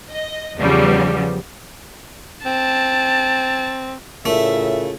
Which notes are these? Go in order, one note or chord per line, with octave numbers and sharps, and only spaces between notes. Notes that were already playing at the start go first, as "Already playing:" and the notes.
D#5
E2 C#3 F3 G3 B3
C4 A5
A2 C#3 A3 F4 A#4 D5 E5